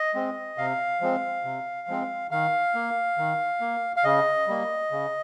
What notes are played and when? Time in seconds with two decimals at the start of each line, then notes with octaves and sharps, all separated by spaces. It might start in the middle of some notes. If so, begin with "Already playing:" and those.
Already playing: D#5
0.14 G#3 C4
0.58 C3 F5
1.01 F3 G#3 C4
1.44 C3
1.88 F3 G#3 C4
2.31 D#3 F5
2.75 A#3
3.18 D#3
3.61 A#3
3.96 F5
4.04 C#3 D#5
4.48 G3 A#3
4.91 C#3